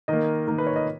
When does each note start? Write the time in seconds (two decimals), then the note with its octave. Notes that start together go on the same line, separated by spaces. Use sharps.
0.08 D#3 A#3 D#5
0.47 D#3 A#3 A#4
0.58 B4
0.67 C#5
0.76 D#5